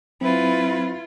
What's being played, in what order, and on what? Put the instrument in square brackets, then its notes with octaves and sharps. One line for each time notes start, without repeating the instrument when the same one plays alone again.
[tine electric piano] F#3 C4 [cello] E4 F4 [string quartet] B4